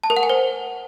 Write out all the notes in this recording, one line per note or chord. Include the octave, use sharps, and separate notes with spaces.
A5
A#4
F#5
G#5
C5